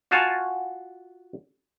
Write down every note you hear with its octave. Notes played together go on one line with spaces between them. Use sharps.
F4 F#4 F5 G#5 A5